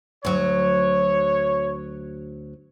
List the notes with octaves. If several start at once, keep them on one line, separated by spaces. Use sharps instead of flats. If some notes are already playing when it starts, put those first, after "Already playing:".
D2 F#3 C#5